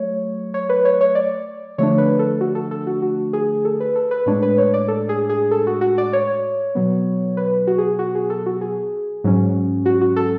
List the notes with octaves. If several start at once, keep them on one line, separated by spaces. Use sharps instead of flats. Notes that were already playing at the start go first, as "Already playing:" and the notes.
Already playing: F#3 A3 C#5
C#5
B4
C#5
C#5
D5
D3 F3 A3 D4 C#5
B4
A4
F#4
A4
A4
F#4
F#4
G#4
A4
B4
A4
B4
A2 G#3 D4 C#5
B4
C#5
D5
A4
G#4
G#4
A4
F#4
F#4
D5
C#5
B2 F#3 B3
B4
F#4
G#4
F#4
G#4
A4
F#4
G#4
G#2 F#3 C#4
F#4
F#4
A4